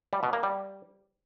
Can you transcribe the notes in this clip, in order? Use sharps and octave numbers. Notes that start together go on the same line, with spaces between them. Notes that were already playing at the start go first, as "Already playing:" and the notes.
G3
B2
A#3
G3